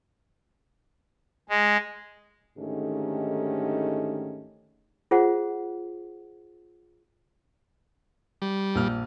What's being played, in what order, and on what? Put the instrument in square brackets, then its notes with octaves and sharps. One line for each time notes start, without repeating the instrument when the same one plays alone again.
[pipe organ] G#3
[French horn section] G#2 D3 D#3 A3 C#4 G4
[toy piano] F4 G#4 C5 F#5
[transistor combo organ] G3
[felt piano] A#1 F6